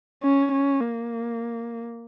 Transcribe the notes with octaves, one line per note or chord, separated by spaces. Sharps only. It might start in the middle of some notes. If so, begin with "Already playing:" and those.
C#4
C#4
A#3